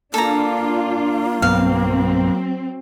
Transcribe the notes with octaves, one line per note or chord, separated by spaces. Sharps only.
A#3 D4 F4 A4 A#5
B1 G2 F#3 B3 C4 F5